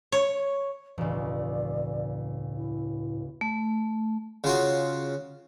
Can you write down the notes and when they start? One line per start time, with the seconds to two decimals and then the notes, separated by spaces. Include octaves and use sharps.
0.12 C#5
0.98 E1 C#2 A2 D5
2.55 E4
3.41 A3
4.44 C#3 F4 F#4